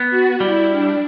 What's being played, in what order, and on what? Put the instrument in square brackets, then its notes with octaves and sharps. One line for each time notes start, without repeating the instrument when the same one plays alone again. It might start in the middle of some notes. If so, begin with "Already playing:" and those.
Already playing: [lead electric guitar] B3
[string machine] F#4
[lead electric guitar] G3 [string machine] E4
[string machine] D4